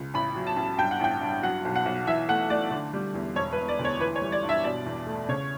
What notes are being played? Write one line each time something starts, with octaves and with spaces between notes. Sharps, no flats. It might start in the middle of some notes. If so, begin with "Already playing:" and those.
Already playing: C#2
A1 B5
F#3
A5
A1
G2 G5
F#5
A1 G5
G2
F#3 F#5
B1
F#5
B1
E3 E5
A3 F#5
A3 D5
D3
G3
E2
E1 C#5
B4
E1
D5
D2
C#5
E3 B4
C#5
G3
D5
G2
E5
B2 D5
E2
A3
C#3 C#5